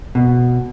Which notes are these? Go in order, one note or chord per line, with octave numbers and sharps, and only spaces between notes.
B2